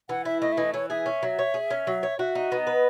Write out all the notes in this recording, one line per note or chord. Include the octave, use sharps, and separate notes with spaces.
E3 F#5
E4 E5
A3 D#5
E5
E3 D#5
E3 C#5
G#4 E5
C#4
F#3
C#5
G#4
C#4
F#3
C#5
F#4 E5
D#4
B3 D#5
B4